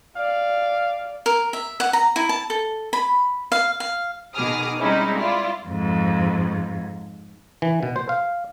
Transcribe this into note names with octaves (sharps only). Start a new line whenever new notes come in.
D5 F5
A#4
E5
F#5
A#5
E4
A5
A4
B5
F5
F5
B2 D#3 G#4 D6 D#6 F6
G3 G#3 C4 C#4 D#4 E4
E4 F4 D5
F2 G#2
E3
B2
C5
F5